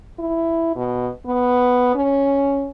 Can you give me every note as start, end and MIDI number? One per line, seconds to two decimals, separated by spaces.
0.19 0.75 64
0.76 1.09 47
1.26 1.91 59
1.95 2.70 61